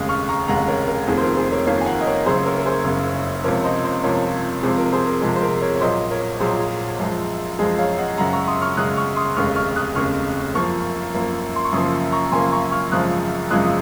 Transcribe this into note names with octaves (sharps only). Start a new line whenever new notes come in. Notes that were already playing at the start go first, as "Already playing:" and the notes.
Already playing: F1 D#2 C#3 G#3 D#6
C#6 F6
A#5 C#6
F1 D#2 C#3 G#3 F#5 A#5
A#4 C#5
A#4
F1 F2 D#3 A#3 G#4
C5
A#4
G#4 C5
A#4 C#5
F1 F2 D#3 A#3 C#5 F5
G#5
F#5 A#5
D#5
A#4 C#5
F#1 F#2 C#3 G#4 C5
A#4 C#5
A#4
G#4 C5
F#1 F#2 C#3
C#2 C3 F3 A#4 C#5
C5 D#5
C5 D#5
C#2 C3 F3 A#4 C#5
F2 C3 F3 G#3 G#4 C5
A#4
G#4 C5
A#4
F2 C3 F3 G#3 G#4
C5
A#4
A#4 C#5
C#5
A#1 A#2 F#3 C5 D#5
A#4 C#5
A#1 A#2 F#3 G#4 C5
F#2 F3 G#3
F#2 F3 G#3 G#4
C#5 F5
D#5 F#5
F#2 C#3 G#3 F#5 A#5
A#5 C#6
C6 D#6
C#6 F6
F#2 C#3 G#3 D#6 F#6
C#6 F6
C6 D#6
F1 D#2 C#3 G#3 C#6 F6
C#6 F6
D#6 F#6
F1 D#2 C#3 G#3 C#6 F6
F#2 F3 A#3 C#6 F6
F#2 F3 A#3
C6
C#6
F#2 C#3 F3 A#3 C6 D#6
A#5 C#6
F#2 C#3 F3 A#3 G#5 C6
A#5 C#6
C#6 F6
G#1 F#2 C#3 F3 G#3 D#6 F#6
G#1 F#2 C#3 F3 G#3 D#6 F#6
D#6